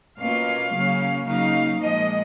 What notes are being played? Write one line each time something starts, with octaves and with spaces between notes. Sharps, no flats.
B2 A#3 C#4 F4 F5
C#3 F#3 A#3 C#4
C#3 F#3 A#3 D#4 F5
A#2 F3 G#3 D#5